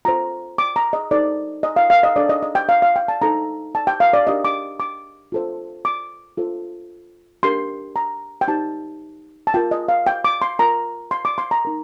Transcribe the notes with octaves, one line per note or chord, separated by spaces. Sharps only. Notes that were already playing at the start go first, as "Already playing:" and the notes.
F4 A4 C5 A#5
D6
A#5
D#5
D#4 A4 C5 D5
D#5
F5
F5
D#5
D4 A4 C5 D5
D#5
D#5
G5
F5
F5
G5
A5
D#4 A4 C5 A#5
A5
G5
F5
D5
D4 G4 A#4 D#5
D6
D6
F4 A4 C5
D6
F4 A4 C5
D4 G4 A#4 C6
A#5
G5
D#4 G4 C5 A5
A5
F4 A#4 G5
D#5
F5
G5
D6
C6
F4 A#4 A#5
C6
D6
C6
A#5
D#4 A#4